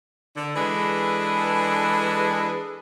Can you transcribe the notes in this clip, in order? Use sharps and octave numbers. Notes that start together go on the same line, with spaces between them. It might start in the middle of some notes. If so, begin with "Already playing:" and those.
D3
E3 G#3 D4 G#4 A4 B4